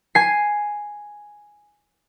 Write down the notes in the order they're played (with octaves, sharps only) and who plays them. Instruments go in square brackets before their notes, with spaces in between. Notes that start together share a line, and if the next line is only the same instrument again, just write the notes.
[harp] G#5 C7